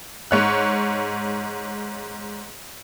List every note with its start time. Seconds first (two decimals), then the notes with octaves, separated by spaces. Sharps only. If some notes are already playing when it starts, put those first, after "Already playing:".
0.31 G#2 C#5 F#6